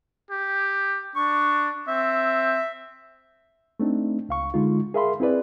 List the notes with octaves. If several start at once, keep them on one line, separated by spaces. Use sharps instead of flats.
G4
D4 C#6
C4 E5
A3 C4 D4 D#4
C#2 F5 C#6
D3 G#3 D#4 F4
G#4 A#4 E5 F5 B5 C6
C4 E4 G#4 B4 D5